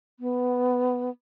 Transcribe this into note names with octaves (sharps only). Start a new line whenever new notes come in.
B3